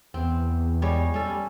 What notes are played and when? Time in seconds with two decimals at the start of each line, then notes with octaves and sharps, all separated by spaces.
0.14 E2 C4
0.82 G3 G#3 C#5
1.14 G3 C#4 A4